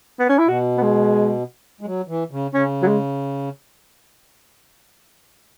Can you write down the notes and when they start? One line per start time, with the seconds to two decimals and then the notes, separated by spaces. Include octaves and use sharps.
0.19 B3
0.29 C#4
0.38 E4
0.47 B2 F#4
0.77 B3
0.82 G#3
1.81 G#3
1.85 F#3
2.08 E3
2.31 C#3
2.53 C#3 C#4
2.82 F#3
2.88 G#3